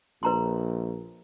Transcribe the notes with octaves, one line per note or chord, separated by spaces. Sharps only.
A#1 B4 A#5 C6